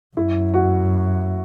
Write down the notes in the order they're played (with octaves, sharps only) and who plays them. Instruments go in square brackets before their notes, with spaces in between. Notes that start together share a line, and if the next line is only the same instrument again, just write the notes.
[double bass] F#2 [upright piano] E4
[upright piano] F#4